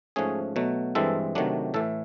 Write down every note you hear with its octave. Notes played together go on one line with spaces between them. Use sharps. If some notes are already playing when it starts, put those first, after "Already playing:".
G#2 F3 A3 C#4 G#4
B2 F#3 A3
G2 E3 G#3 C4 A4
C3 D#3 F#3 A3 D4
A2 E3 A3 A4